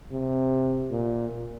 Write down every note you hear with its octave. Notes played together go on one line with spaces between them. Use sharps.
C3
A#2